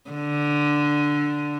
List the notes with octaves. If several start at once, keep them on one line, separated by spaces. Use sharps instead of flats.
D3